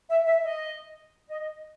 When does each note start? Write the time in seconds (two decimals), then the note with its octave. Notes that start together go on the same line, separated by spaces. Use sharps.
0.09 E5
0.26 E5
0.44 D#5
1.28 D#5